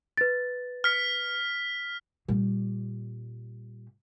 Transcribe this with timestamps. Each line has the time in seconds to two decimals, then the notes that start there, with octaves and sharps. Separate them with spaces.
0.17 B4 A6
0.84 F6 B6
2.28 A#2 G3